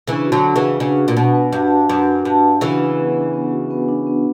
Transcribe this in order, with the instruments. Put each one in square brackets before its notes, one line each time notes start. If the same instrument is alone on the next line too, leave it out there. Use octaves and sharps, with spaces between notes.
[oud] C#3 E3 [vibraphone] D4
[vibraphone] F#4
[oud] D3 F#3
[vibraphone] F#5
[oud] C#3 E3
[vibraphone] B4
[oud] C#3 [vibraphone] D4
[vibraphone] F#4
[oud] A#2
[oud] B2 [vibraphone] F#5
[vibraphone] B4
[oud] G2 [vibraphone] D4
[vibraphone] F#4
[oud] F#2 [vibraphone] F#5
[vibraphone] B4
[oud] G2 [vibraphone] D4
[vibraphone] F#4
[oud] C#3 E3 [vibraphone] F#5
[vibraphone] B4
B3
D4
B3
F#4
B3
D4
B3